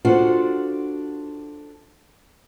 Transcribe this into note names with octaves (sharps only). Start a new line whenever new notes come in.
D4 F4 F#4 A4 C5